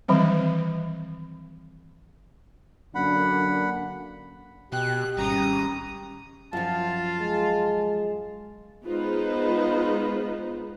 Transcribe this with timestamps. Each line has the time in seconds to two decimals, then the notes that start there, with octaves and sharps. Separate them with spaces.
0.08 D#3 E3 F#3 G3 C4
2.95 F#2 D3 A#3 D4 F#5 B5
4.72 B2 G4 G5 F#6
5.17 G#1 G3 C#4 A#5 D#6
6.53 F#2 F3 F4 A5
7.19 G#3
8.86 G#3 B3 D#4 F4 B4 C5